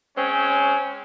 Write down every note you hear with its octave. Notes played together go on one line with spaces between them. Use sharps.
G#3 C4 C#4